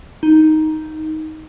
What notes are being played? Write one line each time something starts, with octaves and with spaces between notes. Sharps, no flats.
D#4